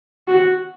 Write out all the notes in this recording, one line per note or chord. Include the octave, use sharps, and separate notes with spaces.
F#4